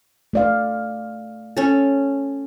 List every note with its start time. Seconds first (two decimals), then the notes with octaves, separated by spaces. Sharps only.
0.33 A3 D5 F5
1.57 C#4 A4